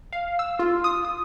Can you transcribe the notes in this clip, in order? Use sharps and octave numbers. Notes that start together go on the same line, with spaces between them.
F5
E6
F4
D#6
D#6